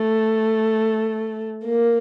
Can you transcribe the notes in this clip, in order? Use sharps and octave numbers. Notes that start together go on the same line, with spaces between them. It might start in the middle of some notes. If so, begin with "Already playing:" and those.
Already playing: A3
A#3